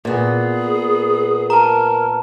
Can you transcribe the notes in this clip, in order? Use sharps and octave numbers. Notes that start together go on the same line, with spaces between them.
A#2 B3 G#4
A#4 A5 A#5